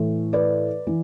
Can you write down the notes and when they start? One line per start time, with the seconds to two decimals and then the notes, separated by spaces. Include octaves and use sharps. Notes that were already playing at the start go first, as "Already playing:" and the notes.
Already playing: A2 E3
0.33 B4 D5
0.87 E3